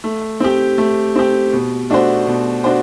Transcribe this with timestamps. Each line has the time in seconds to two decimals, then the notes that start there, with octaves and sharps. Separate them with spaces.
0.04 A3
0.40 C4 G4
0.78 A3
1.16 C4 G4
1.53 B2
1.90 A3 D4 F#4 C5
2.27 B2
2.64 D4 F#4 C5